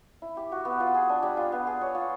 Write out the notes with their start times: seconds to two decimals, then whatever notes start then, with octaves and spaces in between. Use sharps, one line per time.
0.22 E4
0.37 G4
0.52 F#4
0.65 B3
0.80 F4
0.95 G#4
1.09 D4
1.23 G3
1.37 F4
1.52 B3
1.67 G#4
1.81 C#5
1.95 F4